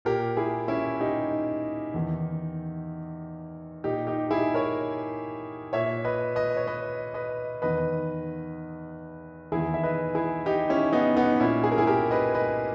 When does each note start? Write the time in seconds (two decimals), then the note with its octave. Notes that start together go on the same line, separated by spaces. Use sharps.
0.05 A#2 G4 A#4
0.37 E4 G#4
0.68 C#4 E4
1.00 D#4 G4
1.94 E2 D#3
3.84 A#2 D#4 G4
4.07 D#4 G4
4.31 E4 G#4
4.54 A#4 C#5
5.73 A#2 C#5 E5
6.05 B4 D#5
6.35 B4 D#5
6.57 C#5
6.67 B4 D#5
7.14 B4 D#5
7.62 E2 D#3 B4 D#5
9.52 E2 D#3 E4 G#4
9.74 E5
9.83 B4 D#5
10.15 E4 G#4
10.46 D#4 G4
10.70 C#4 E4
10.93 B3 D#4
11.17 B3 D#4
11.40 A#2 C#4 E4
11.64 G#4
11.72 A#4
11.78 E4 G#4
11.87 G4 A#4
12.11 B4 D#5
12.34 B4 D#5